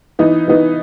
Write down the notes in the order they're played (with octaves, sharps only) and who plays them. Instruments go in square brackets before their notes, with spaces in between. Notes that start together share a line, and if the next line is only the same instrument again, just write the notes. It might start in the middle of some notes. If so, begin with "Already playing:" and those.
[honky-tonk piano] E3 B3 D#4
E3 B3 D#4